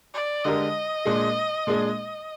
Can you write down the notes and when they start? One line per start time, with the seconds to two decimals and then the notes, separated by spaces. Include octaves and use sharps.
0.14 D5
0.45 D3 G#3 D4 G4 A#4 D#5
1.05 A#2 G#3 D4 G#4
1.67 A#2 G#3 D4 G#4